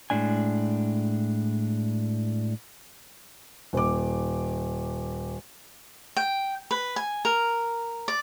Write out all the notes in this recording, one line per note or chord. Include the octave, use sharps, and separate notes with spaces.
A2 G#3 D4 G#5
D#1 D6
G5
B4
G#5
A#4
D5